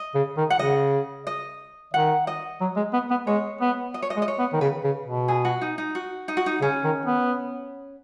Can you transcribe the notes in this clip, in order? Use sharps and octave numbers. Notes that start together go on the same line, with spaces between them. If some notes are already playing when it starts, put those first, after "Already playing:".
Already playing: D#5
C#3
D#3
F#5
C#3 D#5
D#5
D#3 F#5
D#5
F#3
G#3
B3
B3
G#3 C#5
B3
D#5
C#5
D#5
G#3
D#5
C#5
B3
D#3
C#3 B4
C#3
B2
G#4
F#4
D#4
D#4
F#4
D#4
F#4
D#4
C#3 C#4
D#3
B3